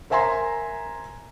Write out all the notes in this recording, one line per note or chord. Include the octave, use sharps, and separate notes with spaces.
A#4 C5 E5 G#5 A#5 C6